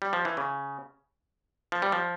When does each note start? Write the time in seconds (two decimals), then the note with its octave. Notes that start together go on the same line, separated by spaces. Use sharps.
0.02 G3
0.13 F3
0.25 E3
0.37 C#3
1.72 F3
1.82 G3
1.92 F3